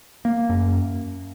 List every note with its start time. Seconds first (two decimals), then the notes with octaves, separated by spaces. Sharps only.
0.25 A#3
0.49 F#2